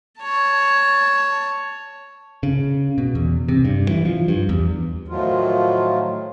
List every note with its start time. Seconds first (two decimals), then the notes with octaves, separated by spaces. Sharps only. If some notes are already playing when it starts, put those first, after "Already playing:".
0.22 C#5 A5
2.43 C#3
2.98 B2
3.15 E2
3.49 C3
3.65 G2
3.89 E3
4.05 F3
4.28 G2
4.49 E2
5.08 A2 D#3 F3 F#3 F4